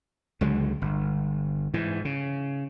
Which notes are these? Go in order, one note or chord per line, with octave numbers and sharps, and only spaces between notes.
C#2 D3 F#3 G#3
G1
G#2 E3
C#3